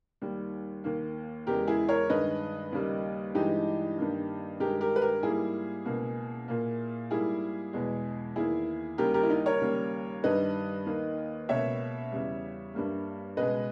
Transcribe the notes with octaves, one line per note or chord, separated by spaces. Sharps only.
D#2 D#3 G3
D#2 D#3 A#3
E2 C#3 G#3 G4 A#4
E4 G#4
A#4 C#5
G2 D#3 G#3 B4 D#5
D#2 C#3 G3 A#3
G2 E3 G#3 D#4 G4
G2 D#3 A#3
G2 D#3 G#3 G4 A#4
G4 A#4
B4
G4 A#4
G#2 G3 A#3 E4 G#4
C#2 B2 A#3
A#2 A#3
G#2 G3 A#3 E4 G#4
E2 B2 G#3
E2 D#3 A#3 E4 G#4
D#2 C#3 G3 G4 A#4
G4 A#4
E4
D#4
A#4 C#5
D#2 C#3 G3 A#3
G2 D#3 G3 B4 D#5
D#2 D#3 A#3
C#2 B2 A#3 C#5 E5
E2 C#3 G3
G2 G3 A#3
C#2 B2 G#3 B4 D#5